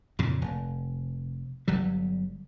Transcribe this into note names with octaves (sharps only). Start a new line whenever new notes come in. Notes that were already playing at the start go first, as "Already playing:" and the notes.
F2 A#2 C#3
F1
G1 F#3 G3